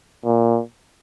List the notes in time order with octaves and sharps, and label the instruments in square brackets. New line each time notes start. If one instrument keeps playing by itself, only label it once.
[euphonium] A#2